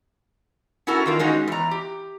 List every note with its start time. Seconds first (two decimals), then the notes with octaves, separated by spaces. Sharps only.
0.87 C#4 E4 F#4 A4 A#4
1.06 D#3 F4 A#4
1.19 G#3 C#4 D#4 F#4
1.48 E2 A#5
1.71 G4